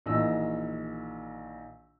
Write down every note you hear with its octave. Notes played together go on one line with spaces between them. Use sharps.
A#1 D#3 E3 D#5 E6